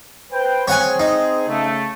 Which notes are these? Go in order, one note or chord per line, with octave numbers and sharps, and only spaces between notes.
B4 C5 G5
C4 G#4 C#5 F#5 G#5
D#4
C#3 A3